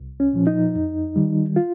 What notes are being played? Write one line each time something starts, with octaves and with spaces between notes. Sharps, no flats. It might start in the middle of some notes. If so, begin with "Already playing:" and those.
Already playing: C2
C#4
A#2 F3
D#4
F2
D#3 G3
F4